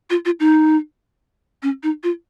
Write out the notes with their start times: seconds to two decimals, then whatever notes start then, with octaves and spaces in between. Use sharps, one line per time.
0.10 F4
0.25 F4
0.40 D#4
1.63 C#4
1.83 D#4
2.03 F4